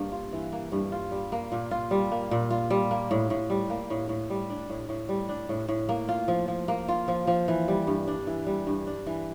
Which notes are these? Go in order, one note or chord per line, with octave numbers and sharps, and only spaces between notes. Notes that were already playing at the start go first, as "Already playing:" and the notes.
Already playing: G2 A#3
F4
E3
A#3
G2
F4
G3
A#3
A#2
F4
G3
A#3
A#2
F4
G3
A#3
A2
A2
G3
A#3
A2
A2
G3
D4
A2
A2
G3
D4
A2
A2
A#3
F4
F3
F3
A#3
F4
F3
F3
E3
G3
G2
D4
E3
G3
G2
D4
E3